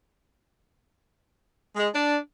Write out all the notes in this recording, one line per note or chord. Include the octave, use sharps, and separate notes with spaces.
G#3
D4